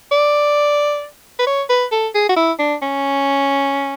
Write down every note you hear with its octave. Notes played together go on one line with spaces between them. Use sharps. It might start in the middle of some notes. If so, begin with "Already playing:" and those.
D5
B4
C#5
B4
A4
G#4
F#4
E4
D4
C#4